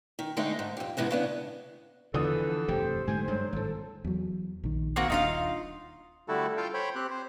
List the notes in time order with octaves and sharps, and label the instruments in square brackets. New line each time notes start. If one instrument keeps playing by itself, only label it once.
[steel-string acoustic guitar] D#3
D3 G#3 A3 C4 D#4 G#4
G#2
F2 G4
G#2 C3 E3 B3 C4
C#3 B3 D4
[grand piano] E2 D3 D#6 [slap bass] E3 F3 [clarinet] A4 [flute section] B4
[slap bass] F1 G2 E3 [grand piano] G4 [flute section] C5
[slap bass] G#2 D3 A3 [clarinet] G#5
[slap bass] G2 G#3 [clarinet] F#3
[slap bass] G#1 A2 [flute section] A4
[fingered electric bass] E2 F#3
A#1 D#3
[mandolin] A#3 C4 F#4
[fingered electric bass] D#1 D4 [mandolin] D#4 F4 F5
[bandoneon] D3 G3 A3 E4 F#4 A4
F4 A4 F5 G5
C5 C#5 G5 B5
C4 G4 F#6
C5